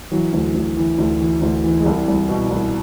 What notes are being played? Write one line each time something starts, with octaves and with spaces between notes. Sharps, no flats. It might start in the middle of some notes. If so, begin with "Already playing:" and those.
E3 F#3
D2
D2
E3
D2
E3
D2
E3
G#3
C2 G3
C2
B2
C2